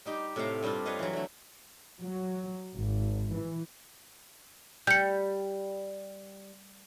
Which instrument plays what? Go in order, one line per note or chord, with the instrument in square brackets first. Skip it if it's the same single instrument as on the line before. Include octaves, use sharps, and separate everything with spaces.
[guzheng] G3 D#4 G4
A2 C3 C4 A4 F5 A#5
G2 G3 C4 D4 F4
F4 B4 C#5 D#5 F5
E3 F#3
D3 A3
[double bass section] F#3
G#1
E3
[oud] G3 [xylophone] G6 C#7